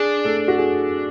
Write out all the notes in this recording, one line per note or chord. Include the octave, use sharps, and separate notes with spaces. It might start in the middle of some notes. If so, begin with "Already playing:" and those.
Already playing: D4 G#4
A3 A4
F#4
G#4